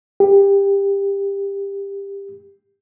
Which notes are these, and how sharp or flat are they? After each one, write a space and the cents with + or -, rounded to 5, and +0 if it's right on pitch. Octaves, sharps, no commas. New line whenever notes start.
G4 +20